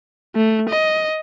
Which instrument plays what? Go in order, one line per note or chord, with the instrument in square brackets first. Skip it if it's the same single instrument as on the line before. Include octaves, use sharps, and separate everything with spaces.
[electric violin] A3
D#5